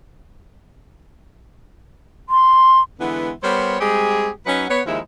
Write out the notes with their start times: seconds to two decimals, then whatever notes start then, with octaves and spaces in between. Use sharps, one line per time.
2.29 C6
3.00 D3 E3 G#3 B3
3.43 G3 B3 A#4 C5 C#5
3.80 G3 G#3 C4 G4 G#4
4.46 F#3 C#4 D#4 B4 F#5
4.69 B3 B4 C#5
4.86 D#2 F3 G#3 D#4 E4 E5